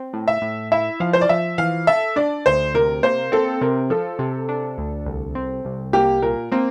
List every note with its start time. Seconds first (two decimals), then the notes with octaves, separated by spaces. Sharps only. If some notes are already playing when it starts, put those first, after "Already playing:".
Already playing: C4
0.13 A2
0.28 E5
0.42 A2
0.72 E4 E5
1.00 F3 F5
1.13 C5
1.21 D5
1.29 F3 E5
1.58 E3 F5
1.87 A4 E5
2.16 D4 D5
2.46 D2 C5
2.74 C3 A#4
3.03 A#3 C5
3.32 C4 A4
3.61 C3 A#4
3.90 F3 A4
4.19 C3
4.49 D4
4.78 D2
5.06 C2
5.35 C4
5.65 C2
5.93 A#3 G4
6.22 A#2 A#4
6.52 A#3 C4